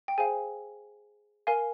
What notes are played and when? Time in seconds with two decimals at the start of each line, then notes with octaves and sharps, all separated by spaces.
0.08 G5
0.18 G#4 C5 F5 G#5
1.47 A#4 F5 G#5